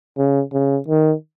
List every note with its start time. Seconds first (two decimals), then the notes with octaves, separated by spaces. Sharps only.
0.17 C#3
0.53 C#3
0.88 D#3